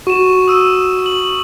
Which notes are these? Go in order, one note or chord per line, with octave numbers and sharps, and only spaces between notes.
F#4 C#6 D#7 E7
D#6 E6 D#7
F#7